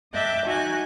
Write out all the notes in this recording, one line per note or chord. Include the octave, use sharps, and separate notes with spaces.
D#5 E5 G5 A5 D6 F#6
D#4 F#4 G#5 F#6